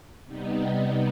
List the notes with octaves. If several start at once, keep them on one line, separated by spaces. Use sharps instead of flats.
C3 G3 B3 D#4